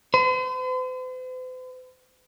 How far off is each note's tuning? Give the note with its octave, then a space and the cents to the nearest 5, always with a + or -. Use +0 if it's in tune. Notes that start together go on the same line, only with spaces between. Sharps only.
C5 -45